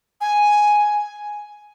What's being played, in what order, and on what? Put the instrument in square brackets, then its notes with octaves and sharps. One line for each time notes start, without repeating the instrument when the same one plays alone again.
[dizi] G#5